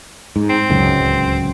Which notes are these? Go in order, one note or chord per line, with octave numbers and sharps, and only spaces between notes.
G#2
C4
D1 C#2 F#2